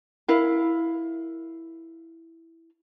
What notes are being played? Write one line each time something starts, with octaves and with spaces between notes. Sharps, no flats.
E4 A#4 F5